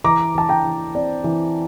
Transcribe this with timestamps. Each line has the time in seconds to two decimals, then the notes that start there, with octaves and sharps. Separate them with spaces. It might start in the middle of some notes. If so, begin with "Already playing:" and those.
0.04 E3 A#5 D6
0.35 E3 A5
0.49 G5 A#5
0.64 E3
0.95 C4 D5
1.24 E3